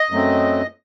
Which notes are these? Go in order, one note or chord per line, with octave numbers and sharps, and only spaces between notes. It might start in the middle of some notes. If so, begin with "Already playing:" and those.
Already playing: D#5
F#2 F#3 A3 C4